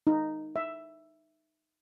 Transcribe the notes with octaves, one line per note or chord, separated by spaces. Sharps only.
D#4
E5